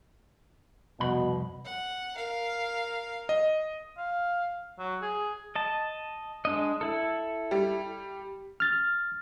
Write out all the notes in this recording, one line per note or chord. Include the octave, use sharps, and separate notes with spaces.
C2 F2 B2 B5
F#5
A#4 F5
D#5
F5
F#3
G#4
D#5 A5
G#3 D4 D#5
E4 A4
G3
F6 A6